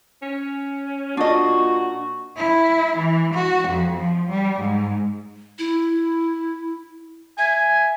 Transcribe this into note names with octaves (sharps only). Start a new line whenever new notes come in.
C#4
A#2 D4 F#4 D#5
E4
E3
F#4
F2
F3
G3
G#2
E4
E5 G#5